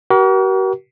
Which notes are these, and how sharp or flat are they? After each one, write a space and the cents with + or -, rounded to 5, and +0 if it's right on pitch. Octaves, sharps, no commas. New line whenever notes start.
F#4 +45 A#4 +35